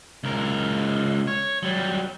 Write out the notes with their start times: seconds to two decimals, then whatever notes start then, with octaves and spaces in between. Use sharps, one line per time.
0.24 C#2 A#4
1.28 C#5
1.63 F#3 G3